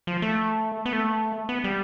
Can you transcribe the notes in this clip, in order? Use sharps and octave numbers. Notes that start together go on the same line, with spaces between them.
F3
A3
B3
A3
B3
G3